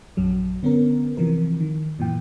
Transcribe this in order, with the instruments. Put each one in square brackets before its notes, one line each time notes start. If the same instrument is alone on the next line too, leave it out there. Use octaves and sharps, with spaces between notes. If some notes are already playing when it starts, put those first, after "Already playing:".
[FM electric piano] A#1 F#2 F#3
D3 B3 C#4 A#4
C3 E3 F3 A#4
D#3
F#2 A#2 E3 G5